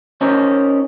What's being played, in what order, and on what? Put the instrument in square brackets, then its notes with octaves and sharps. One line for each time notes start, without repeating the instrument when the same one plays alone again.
[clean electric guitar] C#4 D#4 A#4 C5 C#5